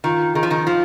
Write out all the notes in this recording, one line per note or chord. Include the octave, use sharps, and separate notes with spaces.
D#3 F4
D#3 G#4
F3
D#3
F3 F4